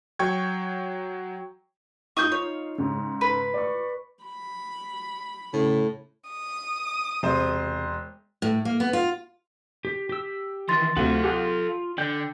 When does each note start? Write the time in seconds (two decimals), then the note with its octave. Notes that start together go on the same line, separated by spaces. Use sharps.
0.19 F#3 G5 C#6 G#6
2.17 D#4 F4 C#6 D#6 G6
2.32 C#5
2.78 G#2 C#3
3.21 B4
3.54 D5 C#6
4.24 B5
5.53 A2 C#3
6.29 D#6
7.23 E1 C3 C5
8.42 A2
8.65 A#3
8.80 B3
8.93 F4
9.85 G4
10.09 G4 E6
10.69 D#3 E3 C6 A6
10.97 D2 C3 A3 F4 F#4 A4 F5
11.24 F4 G4 G#4 F#5
11.98 D3 D5 G5 G6